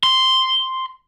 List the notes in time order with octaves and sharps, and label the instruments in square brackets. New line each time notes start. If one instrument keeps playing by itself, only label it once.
[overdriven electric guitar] C6